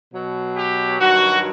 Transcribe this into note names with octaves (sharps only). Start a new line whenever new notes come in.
B2 F#3
G4
G2 D#3 F#3 F#4